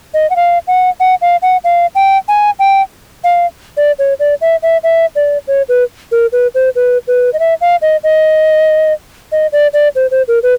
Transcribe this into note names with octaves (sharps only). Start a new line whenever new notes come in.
D#5
F#5
F5
F#5
F#5
F5
F#5
F5
G5
G#5
G5
F5
D5
C#5
D5
E5
E5
E5
D5
C#5
B4
A#4
B4
C5
B4
B4
D#5
E5
F5
D#5
D#5
D#5
D5
D5
C5
C5
A#4
B4